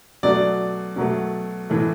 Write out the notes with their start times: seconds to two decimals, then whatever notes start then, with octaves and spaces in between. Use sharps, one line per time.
0.23 B2 F#3 A3 D5
0.96 B2 F#3 A3
1.69 A2 E3 A3